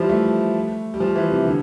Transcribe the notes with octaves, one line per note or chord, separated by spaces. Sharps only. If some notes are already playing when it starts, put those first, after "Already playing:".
Already playing: E3 F3 G3
A3
G3
F3
E3
C3
D3